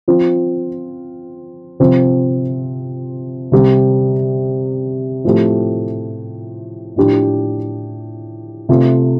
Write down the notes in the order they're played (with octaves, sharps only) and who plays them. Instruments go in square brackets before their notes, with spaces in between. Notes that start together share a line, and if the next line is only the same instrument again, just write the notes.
[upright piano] F3 C4 F4
C3 F3 C4
C3 G3 C4 G4
A2 F3 A3 C4 G4
A2 F3 D4 G4
C3 A3 F4